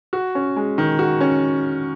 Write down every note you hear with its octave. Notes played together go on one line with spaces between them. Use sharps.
F#4
C#4
G#3
D#3
F#4
C#4